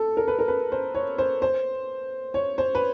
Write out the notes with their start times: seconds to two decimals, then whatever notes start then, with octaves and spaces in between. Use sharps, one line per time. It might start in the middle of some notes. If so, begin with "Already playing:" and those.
Already playing: A4
0.17 A#4
0.28 B4
0.39 A#4
0.48 B4
0.72 C5
0.94 C#5
1.18 C5
1.42 C5
2.34 C#5
2.58 C5
2.75 B4